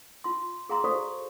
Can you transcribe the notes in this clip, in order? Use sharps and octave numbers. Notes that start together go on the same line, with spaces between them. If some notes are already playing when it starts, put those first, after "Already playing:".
F4 C6
G#4 F5 A#5 C6
F#4 A4 C5 D5 C#6